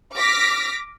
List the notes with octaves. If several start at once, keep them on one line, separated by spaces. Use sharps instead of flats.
D6 F6 A#6 B6